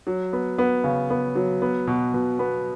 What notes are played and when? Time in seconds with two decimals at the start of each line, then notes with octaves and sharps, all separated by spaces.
0.07 F#3
0.33 B3
0.58 B3
0.84 C#3
1.10 B3
1.36 F#3
1.62 B3
1.87 B2
2.14 B2
2.39 B3